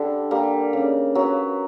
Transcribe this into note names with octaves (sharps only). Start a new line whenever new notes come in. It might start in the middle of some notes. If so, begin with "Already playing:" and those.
Already playing: D3 G3
G3 A#3
C#3
F#3 B3